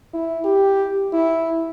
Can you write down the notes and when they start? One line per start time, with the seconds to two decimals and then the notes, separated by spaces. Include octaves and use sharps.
0.14 E4
0.45 G4
1.13 E4